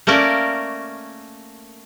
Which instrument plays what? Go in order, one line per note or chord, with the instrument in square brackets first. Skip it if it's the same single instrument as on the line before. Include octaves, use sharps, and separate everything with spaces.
[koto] A3 A#3 C#4 A#4 D5